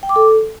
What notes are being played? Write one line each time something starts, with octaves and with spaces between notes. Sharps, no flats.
G5
D6
A4